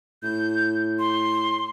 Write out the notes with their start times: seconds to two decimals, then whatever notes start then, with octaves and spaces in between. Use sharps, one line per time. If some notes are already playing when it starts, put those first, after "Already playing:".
0.23 A2 G6
0.99 C6